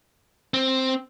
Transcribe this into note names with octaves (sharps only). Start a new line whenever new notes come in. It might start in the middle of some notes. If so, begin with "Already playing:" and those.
C4